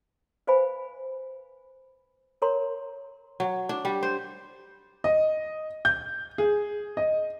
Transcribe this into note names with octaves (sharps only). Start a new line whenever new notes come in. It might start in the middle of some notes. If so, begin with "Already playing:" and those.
B4 C5 F5 G#5 B5
A#4 C#5 A#5 C6
F#3
D4
G3
C5
D#5
G6
G#4
D#5